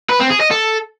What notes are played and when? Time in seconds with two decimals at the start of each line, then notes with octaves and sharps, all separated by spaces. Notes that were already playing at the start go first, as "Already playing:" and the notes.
0.10 B4
0.20 C4
0.30 G#4
0.41 D#5
0.51 A4